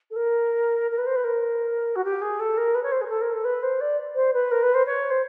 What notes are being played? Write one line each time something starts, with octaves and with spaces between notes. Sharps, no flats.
A4
A#4
A#4
B4
C5
B4
A#4
F#4
G4
G#4
A4
A#4
B4
C#5
C5
G#4
A#4
A4
A#4
A4
B4
C5
D5
C5
B4
A#4
B4
C5
C#5
C5